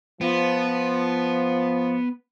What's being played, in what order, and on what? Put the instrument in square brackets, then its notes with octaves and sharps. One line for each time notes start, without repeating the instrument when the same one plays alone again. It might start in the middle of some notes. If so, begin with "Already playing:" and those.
[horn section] F3 [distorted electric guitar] B3